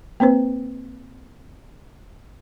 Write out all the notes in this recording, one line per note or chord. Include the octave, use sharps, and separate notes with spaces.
A#3 C4 B4 C5